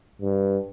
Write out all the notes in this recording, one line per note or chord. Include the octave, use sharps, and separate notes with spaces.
G2